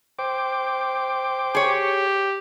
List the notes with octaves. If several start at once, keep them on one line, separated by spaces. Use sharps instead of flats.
C5 G5 D6
G4 G#4 C#5